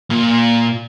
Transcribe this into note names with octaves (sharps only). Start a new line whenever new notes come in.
A#2